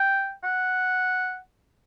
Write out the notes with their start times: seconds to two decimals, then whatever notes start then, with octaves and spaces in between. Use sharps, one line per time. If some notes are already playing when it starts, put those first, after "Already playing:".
Already playing: G5
0.44 F#5